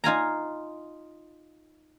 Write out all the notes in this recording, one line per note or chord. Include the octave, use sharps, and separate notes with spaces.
D#4 F4 G#5 A#5